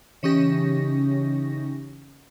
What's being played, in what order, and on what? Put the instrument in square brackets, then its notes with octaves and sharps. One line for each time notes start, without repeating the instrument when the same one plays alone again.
[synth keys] C#3 E3 C#4 D#4 G4 A#6